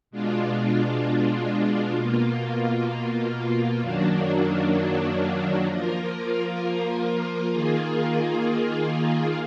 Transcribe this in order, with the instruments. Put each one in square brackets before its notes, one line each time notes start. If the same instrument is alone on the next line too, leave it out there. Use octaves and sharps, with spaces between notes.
[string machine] B2 G#3 D4 F4
B2 A#3 F4
F#2 D#3 F#3 A#3 D4
F3 A#3 F4 A#4
D#3 A#3 F4 G#4